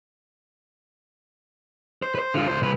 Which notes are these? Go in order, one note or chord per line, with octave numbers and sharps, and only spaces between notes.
C5
B4 C5
D3 F4
C#2 C5
C2 B4